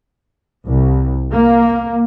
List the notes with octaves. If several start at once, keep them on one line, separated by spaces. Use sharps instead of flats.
C2
A#3